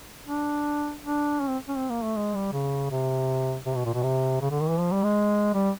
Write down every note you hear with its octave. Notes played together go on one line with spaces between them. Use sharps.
D4
D4
C#4
C4
C#4
C4
A#3
A3
G#3
G3
C#3
C3
C3
B2
A#2
B2
C3
C#3
D3
D#3
E3
F3
G3
G#3
G3